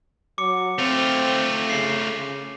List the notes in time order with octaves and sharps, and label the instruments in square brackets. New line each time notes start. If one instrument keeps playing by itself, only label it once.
[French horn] F#3 [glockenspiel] D6 C#7
[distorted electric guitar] A3 F4 [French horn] C4
[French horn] C#3 [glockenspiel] C7
[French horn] C#3